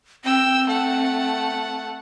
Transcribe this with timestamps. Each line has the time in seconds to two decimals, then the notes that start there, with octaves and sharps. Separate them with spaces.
0.24 C4 G5 E6
0.68 A3 F#5